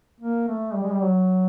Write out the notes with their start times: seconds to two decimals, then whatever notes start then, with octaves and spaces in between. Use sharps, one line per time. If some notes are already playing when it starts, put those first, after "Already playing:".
0.20 A#3
0.48 A3
0.74 G3
0.83 G#3
0.92 G3
1.02 F#3